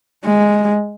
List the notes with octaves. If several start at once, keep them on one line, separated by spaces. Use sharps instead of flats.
G#3